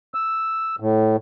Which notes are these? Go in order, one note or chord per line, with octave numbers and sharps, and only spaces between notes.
E6
A2